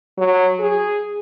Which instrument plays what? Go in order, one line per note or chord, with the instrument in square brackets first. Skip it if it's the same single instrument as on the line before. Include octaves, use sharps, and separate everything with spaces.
[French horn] F#3
G#4